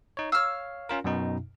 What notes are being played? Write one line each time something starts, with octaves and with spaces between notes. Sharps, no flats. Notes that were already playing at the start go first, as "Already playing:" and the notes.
D#4 C#5
C#5 F5 E6 F6
C#4 F4 A#4
F#2 B2 D#4